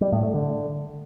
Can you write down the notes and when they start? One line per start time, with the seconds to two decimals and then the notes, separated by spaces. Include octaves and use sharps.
0.01 G3
0.12 A2
0.23 A3
0.34 D3